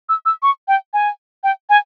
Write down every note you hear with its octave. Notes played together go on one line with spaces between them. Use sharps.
E6
E6
C#6
G5
G#5
G5
G#5